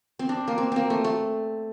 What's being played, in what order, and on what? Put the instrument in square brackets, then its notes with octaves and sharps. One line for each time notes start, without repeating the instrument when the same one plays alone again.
[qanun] C4
D4
A#3
C4
A#3 C4
A3
A3